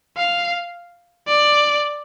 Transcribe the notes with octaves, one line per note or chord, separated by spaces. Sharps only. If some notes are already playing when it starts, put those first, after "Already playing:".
F5
D5